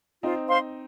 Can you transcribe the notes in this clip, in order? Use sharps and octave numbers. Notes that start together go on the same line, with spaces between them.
C4 D#4 F4
C5 F5 C6